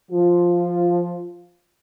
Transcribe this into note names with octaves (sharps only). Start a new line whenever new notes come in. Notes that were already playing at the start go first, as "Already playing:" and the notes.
F3 F4